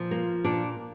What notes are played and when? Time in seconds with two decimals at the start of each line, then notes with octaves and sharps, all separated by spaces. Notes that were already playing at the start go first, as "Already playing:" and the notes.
Already playing: A#2 F3
0.11 A#3
0.44 A#2 D4